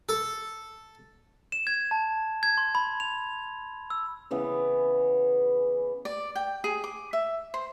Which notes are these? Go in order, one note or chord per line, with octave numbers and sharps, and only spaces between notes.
A4
E7
G#6
A5
G#6
C6
B5
F7
E6
C#3 E3 B3
D5
G5
G#4
D6
E5
C5